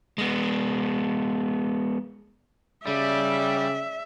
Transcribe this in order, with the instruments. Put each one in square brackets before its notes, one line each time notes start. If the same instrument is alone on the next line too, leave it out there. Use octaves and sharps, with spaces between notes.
[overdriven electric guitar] G#3 B3
[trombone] C#3 [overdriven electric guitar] G3 [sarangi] D5 [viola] E5